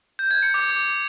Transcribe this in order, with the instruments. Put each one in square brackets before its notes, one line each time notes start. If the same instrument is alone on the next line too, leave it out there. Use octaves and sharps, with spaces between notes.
[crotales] G6
G#6
C#7
D6